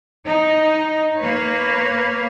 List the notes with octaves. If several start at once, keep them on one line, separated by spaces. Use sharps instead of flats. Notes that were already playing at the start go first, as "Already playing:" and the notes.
D#4
A#3 B4 C#5